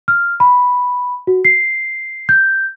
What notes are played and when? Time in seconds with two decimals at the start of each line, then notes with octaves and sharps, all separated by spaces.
0.08 F6
0.40 B5
1.27 F#4
1.45 C7
2.29 G6